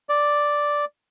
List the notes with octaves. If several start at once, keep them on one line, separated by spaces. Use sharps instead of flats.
D5